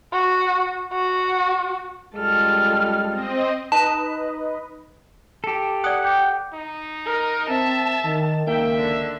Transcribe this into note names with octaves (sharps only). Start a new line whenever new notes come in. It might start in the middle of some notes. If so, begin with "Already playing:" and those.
F#4
F#4
F#2 G3 G#3 F4 A4 F6
C4 D#5
D#4 B4 D#5 A5
G4 A4
D5 F#5 D#6
G5 D6 G6
D#4
A#4
C4 E5 A5
D#3
C#2 D#3 A#3 E5 G5
D3